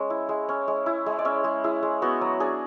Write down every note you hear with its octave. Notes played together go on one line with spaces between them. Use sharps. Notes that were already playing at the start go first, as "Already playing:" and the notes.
Already playing: G#3 C#4
E4
G#3
C#4
G#3
E4
G#3
D5
C#4 E5
G#3
E4 G#4
G#3
B3 F#4
F#3
D4 G#4